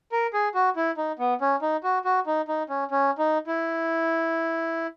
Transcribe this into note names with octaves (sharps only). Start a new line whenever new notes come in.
A#4
G#4
F#4
E4
D#4
B3
C#4
D#4
F#4
F#4
D#4
D#4
C#4
C#4
D#4
E4